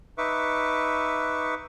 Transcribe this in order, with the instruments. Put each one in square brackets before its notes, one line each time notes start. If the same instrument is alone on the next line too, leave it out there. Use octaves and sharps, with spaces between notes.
[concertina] D#4 B4 E5 C#6 D6